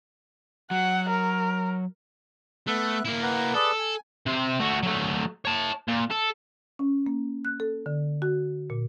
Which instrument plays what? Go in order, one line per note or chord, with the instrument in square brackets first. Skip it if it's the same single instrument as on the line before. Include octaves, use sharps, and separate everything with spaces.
[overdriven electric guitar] F#3 [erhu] F#5
[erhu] A#4
[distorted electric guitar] A3 [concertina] B3 E5 F#6
[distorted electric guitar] A#3 E4
[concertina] B4 F#5 A#5
[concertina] G#4 B4 D5 [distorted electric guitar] A4
[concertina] G#5
[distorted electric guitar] C3 C5
A3 F#4
F#3 A3
C#5 A5
A#2
A4
[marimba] C#4
A#3
F#6
A4
D3
F#4
A#2